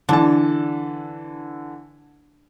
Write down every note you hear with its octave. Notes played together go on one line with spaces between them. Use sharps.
D3 E3 D4 A5